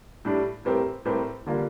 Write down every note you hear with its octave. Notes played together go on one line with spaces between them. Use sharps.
A2 G3 D4
A2 G3 C4 G4 A#4
A2 G3 C4 G4 A#4
D3 G3 A#3 F4